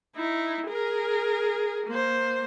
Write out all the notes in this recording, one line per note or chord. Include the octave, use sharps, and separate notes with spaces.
D#4 E4
G#4 A#4
A#3 C5